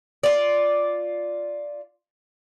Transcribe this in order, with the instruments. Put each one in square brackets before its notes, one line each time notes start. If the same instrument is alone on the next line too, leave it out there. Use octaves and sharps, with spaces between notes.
[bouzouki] F4 D5